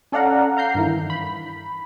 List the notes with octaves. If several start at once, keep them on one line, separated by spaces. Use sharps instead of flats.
C#4 A4 D5 F5 F#5 A#5
F5 A#5 G6 C7
G2 D#3 E3
B5